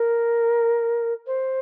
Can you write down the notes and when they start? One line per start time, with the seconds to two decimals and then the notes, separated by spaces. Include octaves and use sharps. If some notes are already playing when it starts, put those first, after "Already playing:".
Already playing: A#4
1.26 C5